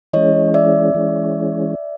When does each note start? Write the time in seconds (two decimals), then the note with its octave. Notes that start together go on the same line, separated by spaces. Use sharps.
0.13 E3 G#3 C#4 C#5 D#5
0.54 D5 E5
0.94 E3 G#3 C#4